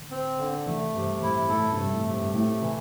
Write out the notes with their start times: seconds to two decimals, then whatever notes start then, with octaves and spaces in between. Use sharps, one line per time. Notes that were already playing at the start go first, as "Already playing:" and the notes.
Already playing: A2 D3
0.11 C4
0.39 D3
0.66 C3 E3 A3
0.94 G2 C3
1.22 A2 E4
1.50 A2 A4
1.71 G2 C3
1.78 A3
1.92 A2
2.06 C3
2.13 G2
2.34 A2 A3
2.62 C3 E3